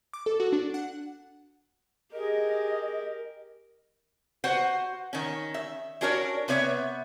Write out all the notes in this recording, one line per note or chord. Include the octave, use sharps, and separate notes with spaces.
D6
A4
F#4
D4
F#5
G4 G#4 A#4 D#5
F#4 B4 C5 F#5
D#3 C#4
E5
C#4 D4 F#4 A#4 C5 C#5
C3 B3 B4 C#5 E5